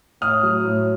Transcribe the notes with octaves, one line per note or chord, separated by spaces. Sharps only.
A2 D#6 F6
F#3
A2